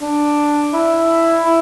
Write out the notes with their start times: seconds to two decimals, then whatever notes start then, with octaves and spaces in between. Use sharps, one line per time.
0.01 D4
0.73 E4
1.45 E4